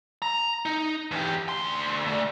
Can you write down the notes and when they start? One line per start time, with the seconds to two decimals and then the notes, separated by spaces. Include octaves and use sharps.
0.22 A#5
0.65 D#4
1.11 E2 G4
1.49 D2 C6
2.07 A3 D5